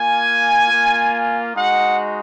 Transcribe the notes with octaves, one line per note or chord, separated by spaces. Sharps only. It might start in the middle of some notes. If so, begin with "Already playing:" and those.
Already playing: A#3 F4 G#5
A#3 F4
G#3 D#4 F#4 F#5